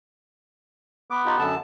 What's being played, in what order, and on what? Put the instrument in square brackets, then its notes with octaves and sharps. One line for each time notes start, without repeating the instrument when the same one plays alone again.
[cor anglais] B3 [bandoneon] D6
[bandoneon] D#4 F4 G4
F#2 D3 A5